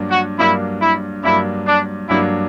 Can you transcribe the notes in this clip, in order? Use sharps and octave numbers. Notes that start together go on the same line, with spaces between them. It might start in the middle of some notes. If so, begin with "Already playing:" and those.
Already playing: G2 F#3 A#3 D4
F#4
G2 F#3 A#3 D4 E4
E4
G2 F#3 A#3 D4 E4
D4
G2 F#3 A#3 D4 E4